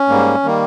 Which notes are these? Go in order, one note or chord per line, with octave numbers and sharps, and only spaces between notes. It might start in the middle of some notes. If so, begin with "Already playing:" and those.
Already playing: C#4
G#2 G3 A#3
D#3 G3 A#3